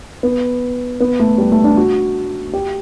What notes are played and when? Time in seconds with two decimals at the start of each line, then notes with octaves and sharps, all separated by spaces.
0.23 B3
1.00 B3
1.20 A3
1.38 G3
1.52 A3
1.64 D4
1.77 F#4
2.53 G4